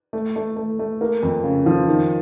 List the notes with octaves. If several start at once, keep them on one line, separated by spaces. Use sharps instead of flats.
A3
A3
A3
A3
A#3
F2
C#3
F3
D#3